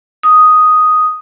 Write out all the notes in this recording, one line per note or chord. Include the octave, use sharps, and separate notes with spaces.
D#6